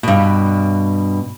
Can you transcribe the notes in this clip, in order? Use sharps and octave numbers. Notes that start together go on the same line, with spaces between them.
G2 B2